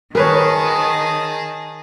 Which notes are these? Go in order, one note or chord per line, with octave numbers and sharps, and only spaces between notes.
D#3 G#4 A#4 B4 C#5 A5